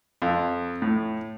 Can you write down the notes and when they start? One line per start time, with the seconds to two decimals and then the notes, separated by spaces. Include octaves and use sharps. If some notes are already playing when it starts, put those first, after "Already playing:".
0.22 F2
0.82 A2